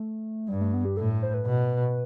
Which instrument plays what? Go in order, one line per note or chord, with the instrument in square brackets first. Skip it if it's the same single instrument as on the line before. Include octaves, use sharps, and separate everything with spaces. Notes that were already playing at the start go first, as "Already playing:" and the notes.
Already playing: [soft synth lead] A3
[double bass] G2 [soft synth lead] G3
[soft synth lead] A3
B3
G4
[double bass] A2 [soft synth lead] A4
[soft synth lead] C5
B4
[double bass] B2